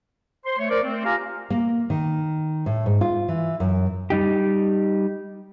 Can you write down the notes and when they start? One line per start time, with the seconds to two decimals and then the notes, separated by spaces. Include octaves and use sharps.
0.46 C5 C6
0.59 A3 C#5
0.70 A#4 C5 D5
0.83 A3 C4
1.05 F4 G4 F5 G#5 A#5 F6
1.50 A#3
1.90 D#3
2.66 A2
2.86 G#2
3.01 F4
3.28 E3
3.60 F#2
4.10 G3 D#4 G4